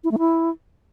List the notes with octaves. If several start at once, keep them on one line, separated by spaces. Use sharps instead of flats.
E4
A3
E4